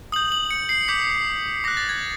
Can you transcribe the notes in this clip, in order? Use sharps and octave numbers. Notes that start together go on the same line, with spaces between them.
D#6 G6 F#7
F#7
C#7
C7
D6 G6 B6
D6 F#6 A#6
A6
G#6